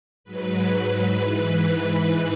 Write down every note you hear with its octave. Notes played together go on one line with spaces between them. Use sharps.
G#2 F#3 B4
B4
G#2 E3 B4